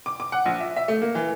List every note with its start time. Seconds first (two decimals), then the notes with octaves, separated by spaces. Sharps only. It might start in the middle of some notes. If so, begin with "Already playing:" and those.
0.06 D6
0.20 D6
0.32 F#5
0.46 A#1
0.60 E5
0.76 E5
0.88 A3
1.02 A#3
1.15 E3